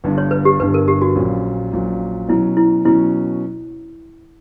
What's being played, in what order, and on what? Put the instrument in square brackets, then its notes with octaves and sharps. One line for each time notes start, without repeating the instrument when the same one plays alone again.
[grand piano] G1 G2 D3
[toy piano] C#5
B4
G4
[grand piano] G1 G2 D3 [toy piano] B4
[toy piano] A#4
G4
F#4
[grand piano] A#1 A#2 F#3 C#4
A#1 A#2 F#3 C#4
[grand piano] B2 F#3 C#4 [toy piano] E4
[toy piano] E4
[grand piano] B2 F#3 C#4 [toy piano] E4